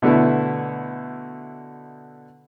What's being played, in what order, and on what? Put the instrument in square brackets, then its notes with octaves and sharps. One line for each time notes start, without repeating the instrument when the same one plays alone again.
[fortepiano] B2 D3 A3 B3 E4